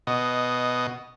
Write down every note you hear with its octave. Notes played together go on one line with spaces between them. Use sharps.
B2 D#5